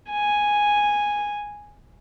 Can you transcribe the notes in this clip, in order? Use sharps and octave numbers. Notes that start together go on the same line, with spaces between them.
G#5